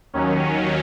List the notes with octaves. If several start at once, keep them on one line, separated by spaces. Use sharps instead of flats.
D#2 D#3 F#3 C#4